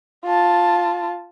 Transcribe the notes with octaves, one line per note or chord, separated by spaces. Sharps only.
F4 A5